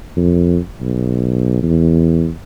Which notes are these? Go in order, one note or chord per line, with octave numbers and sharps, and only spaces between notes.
F2
B1
E2